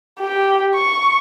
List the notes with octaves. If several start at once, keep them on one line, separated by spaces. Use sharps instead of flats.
G4
C#6